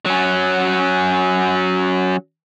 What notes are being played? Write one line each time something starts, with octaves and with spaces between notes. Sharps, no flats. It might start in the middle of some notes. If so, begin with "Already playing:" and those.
F#3 C#4